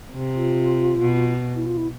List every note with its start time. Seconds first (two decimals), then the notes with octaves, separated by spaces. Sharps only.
0.13 C3
0.35 F4
1.00 B2
1.56 E4
1.66 F4
1.77 E4